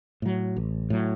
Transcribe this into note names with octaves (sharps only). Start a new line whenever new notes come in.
A2 F#3
A1
A2 F#3